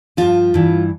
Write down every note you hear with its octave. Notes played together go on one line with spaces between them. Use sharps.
G2 F3 F4
G2 E3